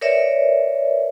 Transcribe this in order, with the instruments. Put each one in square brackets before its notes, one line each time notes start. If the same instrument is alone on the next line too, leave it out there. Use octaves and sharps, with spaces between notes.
[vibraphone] A#4 B4 C#5 D5 E5